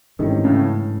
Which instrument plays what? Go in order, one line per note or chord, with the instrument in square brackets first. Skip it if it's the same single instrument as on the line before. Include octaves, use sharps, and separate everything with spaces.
[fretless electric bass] G#2 E3 A3 C#4 [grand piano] C3 D#3
[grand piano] A2 C#3